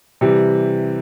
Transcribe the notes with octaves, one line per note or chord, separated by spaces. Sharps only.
C3 E3 G3